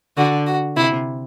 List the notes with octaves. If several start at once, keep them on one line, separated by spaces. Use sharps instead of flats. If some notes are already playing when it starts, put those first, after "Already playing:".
D3 F#4
F#4
C3 E4